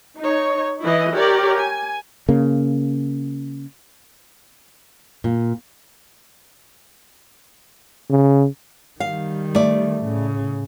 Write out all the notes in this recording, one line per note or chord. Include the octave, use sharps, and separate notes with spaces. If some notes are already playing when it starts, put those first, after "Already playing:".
D#4 C#5
E3 E4 D#5
G4 A#4 C#5 D5
G#5
C#3 A#3
A#2
C#3
D#3 G3 F5
A3 D5
A2 C#3